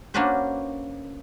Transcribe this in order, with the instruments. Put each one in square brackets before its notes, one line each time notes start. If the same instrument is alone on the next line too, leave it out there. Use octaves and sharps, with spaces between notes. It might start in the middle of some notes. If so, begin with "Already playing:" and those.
[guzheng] A#3 C#4 D4 F#4 B4 C5